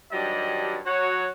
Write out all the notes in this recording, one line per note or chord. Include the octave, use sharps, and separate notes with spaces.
G2 D#3 F#3 G3 D4 D#5
F#3 F#4 C#5